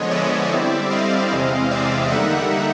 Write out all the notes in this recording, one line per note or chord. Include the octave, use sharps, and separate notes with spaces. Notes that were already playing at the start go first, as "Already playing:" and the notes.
Already playing: D3 F3 G#3 B3 C#5 D#5
D5 E5
D3 G3 C4 E4
D#5 F5
E2 C3 E3 G#3 C4
D5 E5
D3 G3 A#3 D#4 E5 F#5